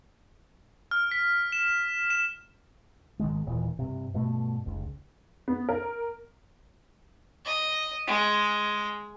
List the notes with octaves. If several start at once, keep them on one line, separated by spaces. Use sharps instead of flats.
F6
B6
E7
E7
G#1 E2 D#3 G#3
D#1 A#2 E3
G2 C3
G2 B2 A3
F1 C#2
B3
A#4
D#5
G#3